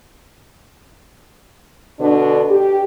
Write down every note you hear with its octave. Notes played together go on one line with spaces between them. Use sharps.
B2 D3 D4
G4